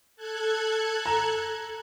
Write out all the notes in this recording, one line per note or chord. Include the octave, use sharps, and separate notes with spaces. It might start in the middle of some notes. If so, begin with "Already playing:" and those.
A4 F#6 G#6
A#5 E7